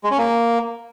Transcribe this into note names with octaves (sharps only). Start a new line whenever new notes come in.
G#3
C#4
A#3